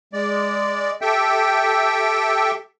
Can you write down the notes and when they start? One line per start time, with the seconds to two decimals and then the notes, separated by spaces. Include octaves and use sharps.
0.13 G#3 D5
1.01 G4 A4 E5 G5